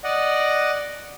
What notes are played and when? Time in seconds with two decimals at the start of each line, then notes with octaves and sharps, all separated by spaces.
0.04 D5 D#5 F#5